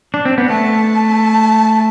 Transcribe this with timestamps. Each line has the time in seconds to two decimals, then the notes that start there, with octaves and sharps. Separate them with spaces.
0.14 D4
0.25 C4
0.38 B3
0.50 A3 A5